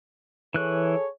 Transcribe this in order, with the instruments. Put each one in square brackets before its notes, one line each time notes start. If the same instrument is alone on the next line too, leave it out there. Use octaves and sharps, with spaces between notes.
[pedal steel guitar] E3 F#6 [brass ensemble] G#4 A4 C#5